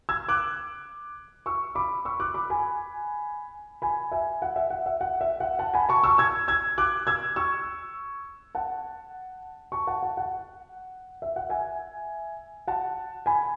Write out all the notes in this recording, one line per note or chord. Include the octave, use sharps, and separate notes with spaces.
E6 G#6
D6 F#6
C#6 E6
B5 D6
C#6 E6
D6 F#6
B5 D6
G#5 B5
G#5 B5
E5 G#5
F#5
E5
F#5
E5
F#5
E5
F#5
F#5 A5
G#5 B5
A5 C#6
C#6 E6
E6 G#6
E6 G#6
D6 F#6
E6 G#6
C#6 E6
F#5 A5
A5 C#6
F#5 A5
F#5
F#5
E5
F#5
E5 G#5
F#5 A5
G#5 B5